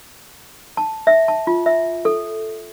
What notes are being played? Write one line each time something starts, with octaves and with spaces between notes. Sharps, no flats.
A5
E5
A5
F4
E5
A4